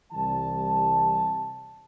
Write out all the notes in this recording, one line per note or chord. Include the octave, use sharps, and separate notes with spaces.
C2 C3 E3 G3 A5